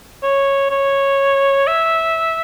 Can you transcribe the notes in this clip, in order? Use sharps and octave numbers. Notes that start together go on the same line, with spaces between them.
C#5
C#5
E5